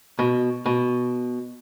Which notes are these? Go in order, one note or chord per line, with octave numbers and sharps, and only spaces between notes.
B2
B2